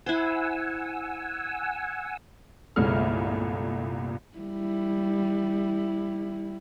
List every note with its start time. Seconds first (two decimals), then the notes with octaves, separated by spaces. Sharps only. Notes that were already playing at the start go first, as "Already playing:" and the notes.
0.06 E4 C5 F#5 G#5 E6
2.76 G1 C2 A#2 G#3 A3 F6
4.38 G3 E4